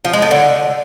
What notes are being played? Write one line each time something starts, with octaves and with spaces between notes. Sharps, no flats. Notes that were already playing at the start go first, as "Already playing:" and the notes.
F3
G#3
A2
D3